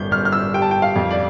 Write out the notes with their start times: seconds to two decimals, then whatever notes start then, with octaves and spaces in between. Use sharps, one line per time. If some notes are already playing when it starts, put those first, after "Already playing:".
Already playing: G1 G6
0.11 G1 F6
0.25 F6
0.32 E6
0.54 G3 G5
0.62 A5
0.71 G5
0.82 F5
0.96 F2
1.11 D5